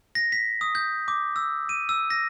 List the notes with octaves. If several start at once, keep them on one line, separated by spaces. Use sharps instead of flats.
A#6
B6
D#6
G6
D6
E6
D#7
E6
A#6